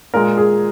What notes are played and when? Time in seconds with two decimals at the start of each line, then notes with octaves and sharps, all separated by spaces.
0.14 A#2 G#3 A#4
0.38 G#4